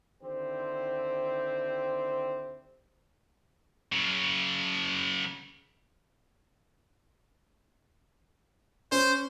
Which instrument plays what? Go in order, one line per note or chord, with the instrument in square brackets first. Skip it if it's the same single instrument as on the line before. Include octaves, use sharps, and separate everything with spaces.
[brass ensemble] D3 D#3 C4 E4 G4 C5
[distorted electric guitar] C#3 F#3
[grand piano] C#4 [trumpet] C5